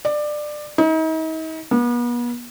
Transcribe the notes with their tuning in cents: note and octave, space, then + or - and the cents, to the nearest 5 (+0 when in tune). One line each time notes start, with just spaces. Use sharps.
D5 +20
D#4 +40
B3 -40